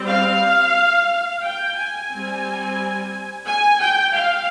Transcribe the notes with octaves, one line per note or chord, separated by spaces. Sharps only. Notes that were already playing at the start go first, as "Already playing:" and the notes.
Already playing: G3 C4
F5
G5
G#5
G3 C4
G#5
G5
F5